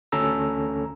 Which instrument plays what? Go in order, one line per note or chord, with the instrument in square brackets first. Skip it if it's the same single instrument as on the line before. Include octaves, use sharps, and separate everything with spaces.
[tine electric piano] D2 C#4 A4 A#5 E6